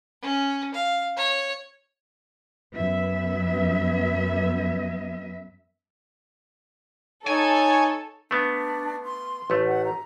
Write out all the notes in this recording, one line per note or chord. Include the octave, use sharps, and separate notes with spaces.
C#4
F5
C#5
F#2 B3 E5
D#4 A4 C#5 G#5
A3 B3 D4
C6
A1 A3
F#5
A#5